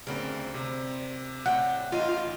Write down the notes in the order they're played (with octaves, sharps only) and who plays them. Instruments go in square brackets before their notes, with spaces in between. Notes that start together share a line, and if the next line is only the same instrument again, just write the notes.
[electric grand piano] D2 C#3 [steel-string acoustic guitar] G3 C4 A#4
[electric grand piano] C3
[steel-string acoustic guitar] A2 G3 G5 [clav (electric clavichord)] F#5
[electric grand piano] A1 D#7 [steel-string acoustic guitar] D#4 [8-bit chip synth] F4